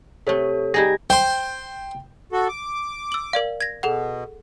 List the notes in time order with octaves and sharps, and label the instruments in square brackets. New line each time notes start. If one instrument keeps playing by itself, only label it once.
[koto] C3 A3 [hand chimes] A4 C#5
[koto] G3 D#4 G#4 [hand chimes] G#6 A#6
[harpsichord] C5 C6 [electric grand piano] G5
[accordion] F#4 A4
D6
[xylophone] E6 F#7
A#4 D5 F5
G#6 A#6
[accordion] B2 [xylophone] G#4 A4 F#5